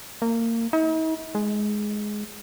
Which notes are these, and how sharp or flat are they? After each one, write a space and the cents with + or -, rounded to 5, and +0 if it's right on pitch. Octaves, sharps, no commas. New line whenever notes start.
A#3 -25
D#4 +45
G#3 +10